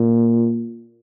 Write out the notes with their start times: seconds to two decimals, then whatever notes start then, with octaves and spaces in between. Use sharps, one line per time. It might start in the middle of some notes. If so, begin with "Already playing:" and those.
Already playing: A#2